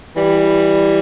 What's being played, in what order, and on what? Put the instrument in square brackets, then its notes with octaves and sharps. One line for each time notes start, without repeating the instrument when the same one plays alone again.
[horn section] E3 G3